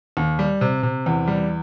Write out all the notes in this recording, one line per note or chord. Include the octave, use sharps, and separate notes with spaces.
D#2
G3
C3
C3
E2
G3